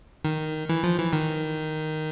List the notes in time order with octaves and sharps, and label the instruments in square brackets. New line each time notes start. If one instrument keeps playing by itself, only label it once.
[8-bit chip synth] D#3
E3
F3
E3
D#3